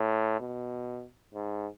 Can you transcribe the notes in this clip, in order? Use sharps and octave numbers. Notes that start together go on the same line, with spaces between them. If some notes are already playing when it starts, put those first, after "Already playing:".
Already playing: A2
B2
G#2